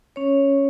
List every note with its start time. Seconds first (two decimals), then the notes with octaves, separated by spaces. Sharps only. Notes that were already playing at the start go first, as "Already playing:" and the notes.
0.16 C#4 C#5